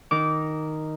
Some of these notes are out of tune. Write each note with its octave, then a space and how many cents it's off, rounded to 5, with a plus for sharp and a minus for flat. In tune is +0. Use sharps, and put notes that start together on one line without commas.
D#3 +0 D#4 +0 D6 -20